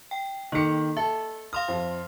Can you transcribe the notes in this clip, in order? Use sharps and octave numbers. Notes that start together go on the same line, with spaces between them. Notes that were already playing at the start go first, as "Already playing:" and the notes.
G5
D#3 A#3 A4 C#7
A4 E5
F5 C6 D#6 F6
F2